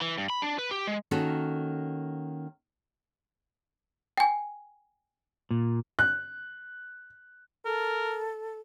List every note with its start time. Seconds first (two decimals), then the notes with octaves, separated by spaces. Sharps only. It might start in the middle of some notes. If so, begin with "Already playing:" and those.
0.02 E3
0.18 G2
0.30 B5
0.42 D4
0.58 B4
0.71 G4
0.87 G#3
1.11 D#3 A#3 C#4 F#4 A4
4.18 G5 G#5
5.51 A#2
5.99 F#6
7.65 A4 A#4